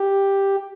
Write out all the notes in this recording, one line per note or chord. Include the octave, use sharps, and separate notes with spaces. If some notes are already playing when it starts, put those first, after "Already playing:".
Already playing: G4